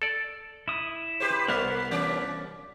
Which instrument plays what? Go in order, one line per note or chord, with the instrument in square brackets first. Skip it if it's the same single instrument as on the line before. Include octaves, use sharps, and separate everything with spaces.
[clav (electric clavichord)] A4 D5
[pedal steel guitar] E4 D#6
[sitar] G4 B4 C5
[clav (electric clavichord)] C2 [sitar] G3 [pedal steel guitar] B3 A#4 B4
[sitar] E3 C#4 D5